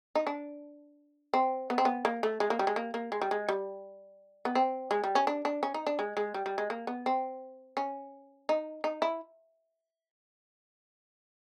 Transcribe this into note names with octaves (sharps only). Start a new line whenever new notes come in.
D#4
D4
C4
B3
C4
B3
A#3
A3
G#3
A#3
G3
G#3
A#3
A#3
G#3
G3
G#3
G3
B3
C4
G#3
G3
C#4
D4
D4
C#4
D#4
D4
G#3
G#3
G3
G3
G#3
A#3
B3
C4
C#4
D#4
D#4
E4